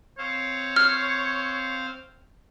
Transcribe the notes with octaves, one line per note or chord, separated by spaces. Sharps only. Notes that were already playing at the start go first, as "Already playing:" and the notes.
C4 C5 C#5 F5
F6